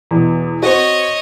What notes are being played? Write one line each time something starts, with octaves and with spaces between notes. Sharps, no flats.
E2 B2
C4 F#4 C#5 D#5